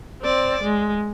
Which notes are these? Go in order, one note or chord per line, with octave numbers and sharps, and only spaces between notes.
C4 D5
G#3